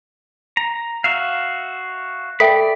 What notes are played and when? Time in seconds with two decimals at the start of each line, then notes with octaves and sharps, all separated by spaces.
0.57 A#5
1.04 F#4 E5 F5
2.40 A4 D5 E5 G5 B5